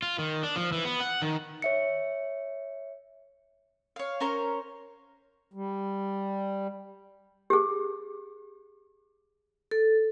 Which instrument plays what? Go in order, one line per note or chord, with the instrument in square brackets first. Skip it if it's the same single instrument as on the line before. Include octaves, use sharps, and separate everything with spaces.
[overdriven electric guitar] F4
D#3
D4
F3
E3
B3
F#5
D#3
[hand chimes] C#5 E5 C#7
[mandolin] C#5 F5
C#4 A#4 C5 C#5
[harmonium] G3
[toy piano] G4 G#4
[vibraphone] A4